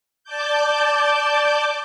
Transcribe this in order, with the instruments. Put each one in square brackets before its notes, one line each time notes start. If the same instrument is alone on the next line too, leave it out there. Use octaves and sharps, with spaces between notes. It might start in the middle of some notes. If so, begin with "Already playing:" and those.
[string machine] D5 A5 D6 G6